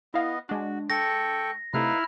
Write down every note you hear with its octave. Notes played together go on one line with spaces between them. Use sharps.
B3 E4 D#5 F5
G#3 D4 F#4
A4 G5 C#6 A#6
C3 A3 D#4 E4 B4 F5 F6